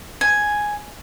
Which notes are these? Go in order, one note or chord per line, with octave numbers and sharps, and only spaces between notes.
G#5